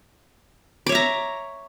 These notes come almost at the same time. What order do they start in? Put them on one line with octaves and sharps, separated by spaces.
D6 C#5 E5 A#5